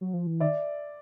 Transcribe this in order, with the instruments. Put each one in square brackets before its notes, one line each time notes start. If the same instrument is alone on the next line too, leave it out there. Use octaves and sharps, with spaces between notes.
[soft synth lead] F#3
F3
E3
[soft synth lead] D#3 [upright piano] D5 E5